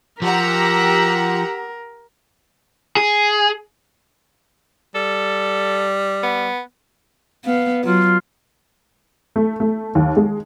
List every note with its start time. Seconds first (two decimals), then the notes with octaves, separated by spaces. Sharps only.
0.22 F3 G4 A#4 F#5 A#5 E6 B6
2.97 G#4
4.95 G3 A4
6.23 B3
7.45 B3 F5
7.85 F#3 F4
9.36 A3
9.60 A3
9.95 D#2
10.17 G#3